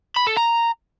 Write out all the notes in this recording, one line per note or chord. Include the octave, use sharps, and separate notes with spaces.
B5
A4
A#5